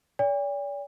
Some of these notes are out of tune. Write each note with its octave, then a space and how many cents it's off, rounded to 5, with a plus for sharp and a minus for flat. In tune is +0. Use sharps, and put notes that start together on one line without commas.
D5 -45 G5 +45